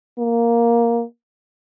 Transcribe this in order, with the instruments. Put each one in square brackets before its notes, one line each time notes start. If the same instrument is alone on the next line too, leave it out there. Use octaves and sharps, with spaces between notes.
[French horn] A#3